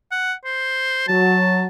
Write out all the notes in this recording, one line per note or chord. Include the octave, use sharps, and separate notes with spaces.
F#5
C5
F#3 A5